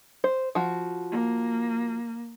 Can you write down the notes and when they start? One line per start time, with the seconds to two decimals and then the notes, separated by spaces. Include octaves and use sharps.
0.24 C5
0.55 F3 F#4
1.12 A#3